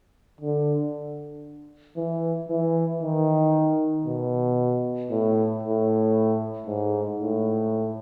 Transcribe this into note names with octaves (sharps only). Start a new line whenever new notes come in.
D3
E3
E3
D#3
B2
A2
A2
G#2
A2